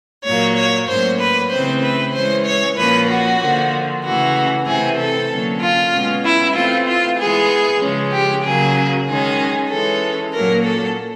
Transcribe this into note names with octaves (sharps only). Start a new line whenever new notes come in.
A#2 F#3 A#3 C#5
C#5
A2 F#3 A#3 C#4 C5
B4
C#3 E3 A3 C4 C5
B4
E3 G#3 C#4 C5
C#5
A#2 F3 A#3 C#4 B4
F#4
D3 F3 A#3
C#3 E3 A3 F#4
C3 E3 A3 C4 G#4
A4
D3 F#3 A#3 C#4
F4
B2 G#3 C#4
E4
E3 A3 C4 F4
F4
E3 G#3 B3 G#4
C#3 F3 G#3 C#4
G4
C#3 F#3 A#3 G#4
D#3 G#3 C#4 G#4
E3 G#3 C#4 A4
A#2 F#3 A#3 C#4 A#4
A4